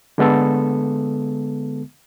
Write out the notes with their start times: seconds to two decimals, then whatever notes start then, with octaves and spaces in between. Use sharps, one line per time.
0.18 D3 G#3 B3 A4